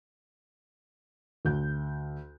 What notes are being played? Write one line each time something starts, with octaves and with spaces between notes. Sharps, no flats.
D2 G6